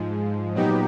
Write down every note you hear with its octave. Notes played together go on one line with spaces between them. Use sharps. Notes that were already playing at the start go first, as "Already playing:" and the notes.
Already playing: G#2 F3 G#3
A#2 F#3 B3 D#4 G4